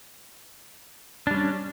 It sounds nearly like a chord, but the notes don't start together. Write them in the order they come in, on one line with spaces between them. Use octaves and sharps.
D4 G3 C#4